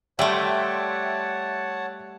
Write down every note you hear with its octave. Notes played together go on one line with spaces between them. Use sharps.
G3 A3 C#5 E5 F#5 G5 A5 C6